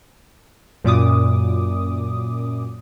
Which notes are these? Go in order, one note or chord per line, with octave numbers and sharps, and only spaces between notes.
F#2 A#2 D6 D#6